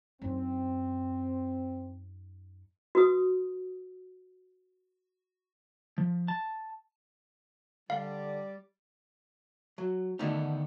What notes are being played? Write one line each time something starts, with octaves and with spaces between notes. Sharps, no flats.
F#2 C4 D#4
F#4 B4 D#6
F3
A5
D3 G3 D5 F5
F#3
D3 D#3 A3 B3 D#4